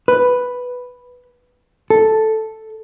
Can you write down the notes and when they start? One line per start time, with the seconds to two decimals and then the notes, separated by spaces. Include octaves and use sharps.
0.08 B4
1.90 A4